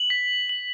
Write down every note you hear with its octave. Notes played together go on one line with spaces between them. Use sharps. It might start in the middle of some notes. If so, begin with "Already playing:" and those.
Already playing: F#7
B6
F#7